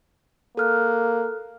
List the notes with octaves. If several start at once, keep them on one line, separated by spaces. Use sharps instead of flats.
A#3 A4 F6 F#6